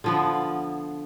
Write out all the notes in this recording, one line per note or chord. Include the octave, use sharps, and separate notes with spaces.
D3 F3 B3